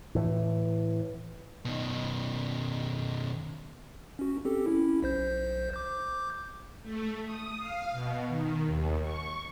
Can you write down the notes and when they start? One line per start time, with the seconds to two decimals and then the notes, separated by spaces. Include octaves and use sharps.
0.15 A2 E3
1.65 B2 D#3
4.19 C#4 F#4
4.45 C4 G4 A4
4.66 C#4 E4
5.03 B1 C5 G6
5.74 D6 G6
6.82 A3
7.25 D#6
7.58 F5
7.92 B2
8.28 D#3
8.65 D#2
9.02 C#6